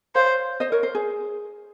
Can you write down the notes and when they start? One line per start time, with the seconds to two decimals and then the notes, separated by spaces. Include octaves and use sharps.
0.15 C5 C#5 F5
0.60 C5 D#5
0.72 A#4 C#5
0.83 C5
0.95 G#4